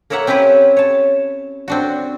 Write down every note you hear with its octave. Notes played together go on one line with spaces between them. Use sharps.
A#3 A#4 C#5 E5 F#5 A#5
C4 C#4 E4 G4 B4
C#5 A5
C4 D4 F#4